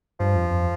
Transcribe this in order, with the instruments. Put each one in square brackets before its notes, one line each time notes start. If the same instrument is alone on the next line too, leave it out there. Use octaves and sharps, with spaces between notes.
[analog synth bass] G2 [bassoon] F3
[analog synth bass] F2
F2